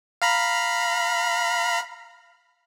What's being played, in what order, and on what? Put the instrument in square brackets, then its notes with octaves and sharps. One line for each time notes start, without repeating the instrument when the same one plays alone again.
[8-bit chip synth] F5 A#5 B5